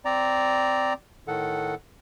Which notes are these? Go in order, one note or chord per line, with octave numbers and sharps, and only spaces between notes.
C4 D5 A#5
A2 D#3 A4 F#5